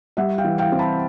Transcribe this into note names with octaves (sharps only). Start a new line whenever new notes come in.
G3 E5 F#5
F5 G5
E3
F5 G5
C4
A5 B5